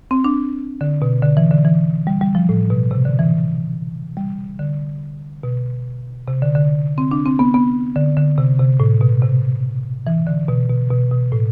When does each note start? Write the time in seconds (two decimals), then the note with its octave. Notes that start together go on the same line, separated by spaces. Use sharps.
0.11 C4
0.24 D4
0.81 D3
1.02 B2
1.22 D3
1.37 E3
1.51 D3
1.65 E3
2.07 G3
2.21 G3
2.35 F3
2.49 A2
2.70 B2
2.91 C3
3.05 D3
3.19 E3
4.17 G3
4.59 D3
5.43 B2
6.28 C3
6.42 D3
6.55 D3
6.98 C4
7.11 D4
7.26 C4
7.39 B3
7.54 B3
7.96 D3
8.17 D3
8.38 C3
8.59 C3
8.80 A2
9.01 B2
9.22 C3
10.07 E3
10.27 D3
10.48 B2
10.69 B2
10.90 B2
11.11 B2
11.32 A2